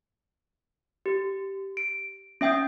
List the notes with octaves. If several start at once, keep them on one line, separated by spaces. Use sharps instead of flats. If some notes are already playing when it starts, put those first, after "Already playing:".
G4
D7
C#4 E5 G5 D#6 G6